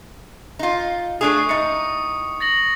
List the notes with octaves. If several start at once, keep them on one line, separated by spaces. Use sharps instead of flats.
D#4 F4
A3 D4 G#4 C#6 D#6
A2 D#4 C#7
A6 A#6 F#7